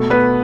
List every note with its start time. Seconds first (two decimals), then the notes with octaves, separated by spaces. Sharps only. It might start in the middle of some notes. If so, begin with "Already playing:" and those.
Already playing: B2 A3
0.10 B3 B4